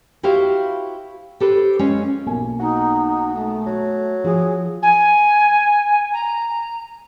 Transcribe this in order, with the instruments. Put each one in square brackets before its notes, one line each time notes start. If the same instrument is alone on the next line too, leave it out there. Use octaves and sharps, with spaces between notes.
[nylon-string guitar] E4 F#4 G4 C5 E5 F5
G4 A4 B4 C5
G#3 C#4 F4
[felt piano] B1 A#3 G#5
[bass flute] D#4 [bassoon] F#4
[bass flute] A3
[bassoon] F#3
[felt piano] F3 [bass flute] G#4
[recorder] G#5
A#5